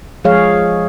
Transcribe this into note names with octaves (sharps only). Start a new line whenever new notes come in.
F3 G#3 G#4 C#5 F5